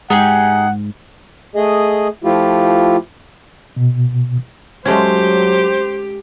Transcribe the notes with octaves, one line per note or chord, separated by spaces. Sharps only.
G#2 D#4 G4 G#4 F#5
A3 G#4 D#5
F3 A3 E4 F4 G4
B2
F#3 G#3 A3 C#4 G4 C5